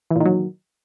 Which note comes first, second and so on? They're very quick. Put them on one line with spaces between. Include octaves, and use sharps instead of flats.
E3 A#2 D#3 F#3